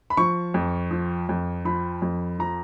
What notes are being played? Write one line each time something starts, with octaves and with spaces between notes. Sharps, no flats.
B5
F3 C#6
F2
F3
F2
F3 B5
F2
F3 A#5